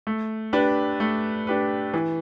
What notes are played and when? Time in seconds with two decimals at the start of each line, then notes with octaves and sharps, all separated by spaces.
0.07 A3
0.53 D4 G4 B4
1.00 A3
1.47 D4 G4 B4
1.94 E3